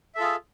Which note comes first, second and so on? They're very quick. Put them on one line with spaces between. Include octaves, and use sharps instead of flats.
E5 A4 F4 G#4